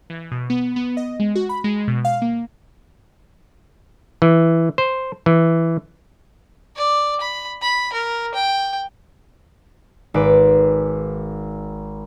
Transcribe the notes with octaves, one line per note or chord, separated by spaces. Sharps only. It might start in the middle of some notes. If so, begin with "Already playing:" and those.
E3
B2
B3
B3
D#5
G#3
F#4
B5
G#3
B2
F5
A#3
E3
C5
E3
D5
B5
B5
A#4
G5
G#1 B4 D6